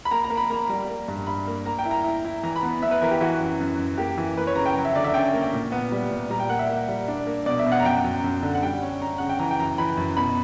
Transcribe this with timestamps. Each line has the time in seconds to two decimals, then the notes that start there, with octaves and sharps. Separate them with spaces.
0.05 B5
0.11 A#3 A#5
0.24 A#5
0.30 A#3
0.37 B5
0.50 A#3 A#5
0.69 G3
0.89 A#3
1.08 G2
1.27 G2 B5
1.47 A#3
1.65 A#3 A#5
1.79 G5
1.85 E4
1.91 A#5
2.04 E4
2.25 E4
2.43 E3 A#5
2.56 B5
2.63 B3
2.82 B3 E5
2.91 B4
3.02 E3 A#4
3.11 G4
3.21 E3 F#4
3.40 F#2
3.60 F#2
3.79 F#2
3.98 A#3 G4
4.18 E3
4.37 A#3 B4
4.47 C#5
4.56 C#3 A#5
4.66 G5
4.75 F#3
4.85 E5
4.96 D3 D5
5.04 E5
5.14 C#4 G5
5.34 A#3
5.53 A#2
5.72 B3
5.92 G3
6.11 A#2
6.30 G3 A#5
6.40 G5
6.49 A#3 F#5
6.59 E5
6.69 A#3 E5
6.88 G3
7.08 D4
7.27 A#3
7.46 B2 D5
7.59 E5
7.66 B2
7.72 F#5
7.80 A#5
7.85 F#2 G5
8.04 F#2
8.24 F#2
8.43 D3
8.54 F#5
8.63 G3 G5
8.82 C#4
9.01 C#4 A#5
9.18 C#3 F#5
9.29 G5
9.39 E3 A#5
9.51 G5
9.59 F#2 A#5
9.78 E3 B5
9.97 F#2
10.17 B2 B5